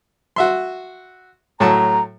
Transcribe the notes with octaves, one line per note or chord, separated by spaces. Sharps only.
F#4 E5 C6
A2 F#3 A5 A#5